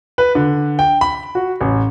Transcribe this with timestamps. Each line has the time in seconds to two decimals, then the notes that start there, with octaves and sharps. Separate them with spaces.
0.18 B4
0.35 D3
0.79 G5
1.01 B5
1.35 F#4
1.61 A1